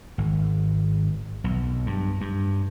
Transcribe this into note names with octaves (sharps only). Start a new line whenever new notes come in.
G#1
B1
G2
G2